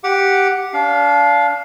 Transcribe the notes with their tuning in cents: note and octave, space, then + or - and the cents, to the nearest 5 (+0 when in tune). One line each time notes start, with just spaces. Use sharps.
G4 +0 F#5 +0 D6 +5
D4 -30 F5 +0